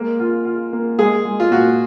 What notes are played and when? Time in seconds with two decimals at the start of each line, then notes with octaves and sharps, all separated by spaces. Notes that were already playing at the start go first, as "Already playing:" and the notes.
Already playing: G#3 A#3
0.20 F4
0.45 F4
0.73 A#3
0.98 G#3 G#4
1.25 G#3
1.40 F4
1.51 A#2 F#4